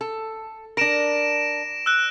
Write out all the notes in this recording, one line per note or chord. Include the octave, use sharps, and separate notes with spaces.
A4
D4 A#4 A#6 D7 E7
E6 F#6